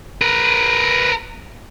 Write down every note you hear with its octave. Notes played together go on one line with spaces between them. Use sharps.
A#4 B4